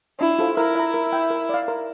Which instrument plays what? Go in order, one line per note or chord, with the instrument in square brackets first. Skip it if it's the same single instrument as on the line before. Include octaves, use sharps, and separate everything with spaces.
[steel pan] D4 [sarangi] E4
[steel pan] F4 A4 C5
[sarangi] E4 [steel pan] A#4
[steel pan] E5 A#5
A#4
E5 G5
A#4
D5 F5
A#4